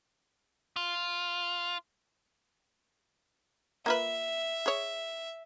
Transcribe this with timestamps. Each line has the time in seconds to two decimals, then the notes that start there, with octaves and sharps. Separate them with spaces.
0.76 F4
3.86 A#3 F4 B4 E5
4.66 G#4 C#5